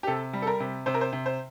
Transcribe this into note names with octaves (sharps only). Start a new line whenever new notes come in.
G4
C3 A4
G3
A4
A#4
C3
C3 C5
A#4
C5
C3
C5